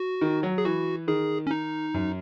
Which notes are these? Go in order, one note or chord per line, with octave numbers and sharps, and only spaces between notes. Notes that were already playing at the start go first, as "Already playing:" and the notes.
Already playing: F#4
D#3
F#3
G#4
E3 F#4
D#3 G#4
C#4
D#4
F#2